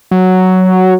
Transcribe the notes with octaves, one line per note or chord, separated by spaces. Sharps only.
F#3